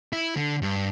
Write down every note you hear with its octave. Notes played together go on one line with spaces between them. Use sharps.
E4
D3
G2